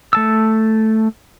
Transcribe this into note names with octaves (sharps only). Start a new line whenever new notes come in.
A3 A5 E6